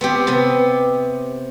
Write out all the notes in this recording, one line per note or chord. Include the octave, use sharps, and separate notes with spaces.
B3 C4 G4
C3 B3